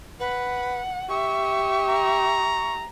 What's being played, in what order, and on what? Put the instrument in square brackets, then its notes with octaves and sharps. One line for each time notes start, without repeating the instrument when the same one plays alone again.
[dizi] B4 [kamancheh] F#5
[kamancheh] G4 E5 [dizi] C#6
[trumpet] A#5